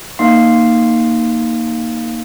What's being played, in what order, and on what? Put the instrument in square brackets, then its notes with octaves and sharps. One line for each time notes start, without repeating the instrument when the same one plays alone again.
[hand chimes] A#3 D#4 F5 C6 C7